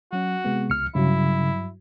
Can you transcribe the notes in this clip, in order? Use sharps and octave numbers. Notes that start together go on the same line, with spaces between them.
F#3 C#4 F#4
C3 G#3 B3
C#2 F6 C#7
G2 C#3 F#3 E4